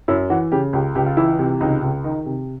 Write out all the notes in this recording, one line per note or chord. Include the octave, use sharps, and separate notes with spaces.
F#2 E4
E3 F#4
C#3 G4
C#2 G4
C#2 G4
F4
E3 E4
C3
C#2 D#4
C#2
D#3 D#4
C3